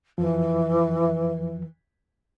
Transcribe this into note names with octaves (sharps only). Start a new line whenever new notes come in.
F2 E3 F3